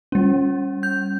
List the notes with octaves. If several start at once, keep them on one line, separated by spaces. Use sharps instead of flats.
G3 C#4
G6